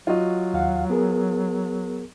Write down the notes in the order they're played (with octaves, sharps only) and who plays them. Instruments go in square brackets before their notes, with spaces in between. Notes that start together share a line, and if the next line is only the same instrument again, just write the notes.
[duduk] F#3 [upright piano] F4 F#4 D#5
[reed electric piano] D#2 F5 F#5
B3 G#4 A#4